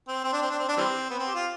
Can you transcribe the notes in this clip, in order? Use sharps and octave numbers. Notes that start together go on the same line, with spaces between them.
C4
C4
D4
C4
D4
C4
D4
E3 G3 C4
B3
C4
G4
F4